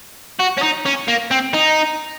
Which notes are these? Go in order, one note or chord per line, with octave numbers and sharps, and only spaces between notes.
F#4
C#4
D#4
C#4
A#3
C4
D#4